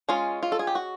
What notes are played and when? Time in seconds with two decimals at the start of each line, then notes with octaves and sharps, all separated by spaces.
0.09 G#3 C#4 F4
0.43 F4
0.52 A4
0.59 G#4
0.67 G4
0.75 F#4